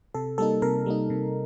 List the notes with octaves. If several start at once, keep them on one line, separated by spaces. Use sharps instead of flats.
C3 A4
G3 A#3 D#4 A4
C3 A#4
G3 A#3 D#4
C3